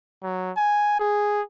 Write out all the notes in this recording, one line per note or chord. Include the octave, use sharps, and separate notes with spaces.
F#3
G#5
G#4